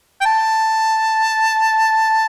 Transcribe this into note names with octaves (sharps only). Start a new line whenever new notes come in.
G5
A5